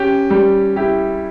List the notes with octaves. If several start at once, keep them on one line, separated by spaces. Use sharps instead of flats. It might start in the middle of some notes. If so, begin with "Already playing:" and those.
Already playing: C#4 G4
G3 G4
E4 G4